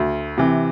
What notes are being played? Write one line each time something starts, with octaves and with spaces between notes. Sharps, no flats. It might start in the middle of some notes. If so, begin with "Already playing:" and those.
Already playing: D2
C3 E3